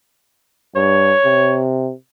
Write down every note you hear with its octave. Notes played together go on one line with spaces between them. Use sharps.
G2 C#5
C3